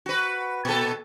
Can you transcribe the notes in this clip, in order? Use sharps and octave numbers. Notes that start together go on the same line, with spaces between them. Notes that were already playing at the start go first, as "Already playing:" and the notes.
F#4 B4
A#2 A4